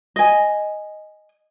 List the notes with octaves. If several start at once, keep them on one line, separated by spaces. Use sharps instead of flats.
D#5 G#5